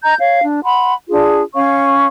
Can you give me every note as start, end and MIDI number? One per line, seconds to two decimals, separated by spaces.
0.04 0.15 75
0.04 0.15 82
0.04 0.15 91
0.19 0.43 73
0.19 0.43 77
0.43 0.63 62
0.64 0.94 78
0.64 0.94 83
0.64 0.94 84
1.10 1.42 62
1.10 1.42 65
1.10 1.42 68
1.55 2.07 61
1.55 2.07 73
1.55 2.07 77
1.55 2.07 85